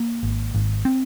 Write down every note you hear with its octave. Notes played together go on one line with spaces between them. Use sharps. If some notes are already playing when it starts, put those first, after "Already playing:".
Already playing: A#3
G#1
G#1
C4